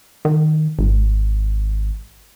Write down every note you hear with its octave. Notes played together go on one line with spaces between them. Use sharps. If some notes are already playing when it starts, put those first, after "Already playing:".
D#3
G#1